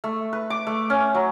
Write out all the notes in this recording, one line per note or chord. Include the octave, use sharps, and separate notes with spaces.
A3
B4
D6
A3
C#4
F#3